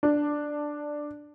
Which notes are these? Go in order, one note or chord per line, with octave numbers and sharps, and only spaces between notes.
D4